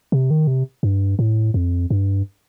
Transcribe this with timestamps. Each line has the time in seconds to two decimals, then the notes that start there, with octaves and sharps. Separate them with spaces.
0.12 C3
0.30 D#3
0.47 C3
0.83 G2
1.19 A2
1.54 F2
1.90 G2